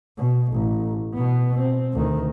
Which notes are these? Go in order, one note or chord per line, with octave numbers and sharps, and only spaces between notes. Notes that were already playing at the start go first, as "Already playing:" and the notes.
B2
A1
B2 B3
C4
D2 D#3